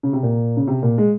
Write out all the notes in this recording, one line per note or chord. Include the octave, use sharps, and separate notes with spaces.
C#3
C3
A#2
C#3
C3
A#2
G#3